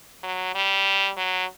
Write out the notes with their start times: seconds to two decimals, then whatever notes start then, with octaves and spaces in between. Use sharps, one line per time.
0.23 F#3
0.55 G3
1.17 F#3